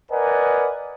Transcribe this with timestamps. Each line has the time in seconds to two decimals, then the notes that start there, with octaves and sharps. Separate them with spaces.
0.11 A#4 B4 D5 D#5 F#5 G#5